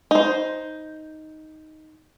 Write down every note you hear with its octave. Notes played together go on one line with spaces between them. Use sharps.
D#4 C5